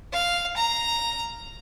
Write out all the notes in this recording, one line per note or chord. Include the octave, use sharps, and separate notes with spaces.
F5
A#5